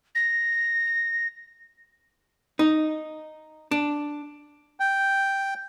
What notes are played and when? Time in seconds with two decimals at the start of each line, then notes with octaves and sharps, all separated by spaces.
0.15 A#6
2.59 D#4
3.71 D4
4.80 G5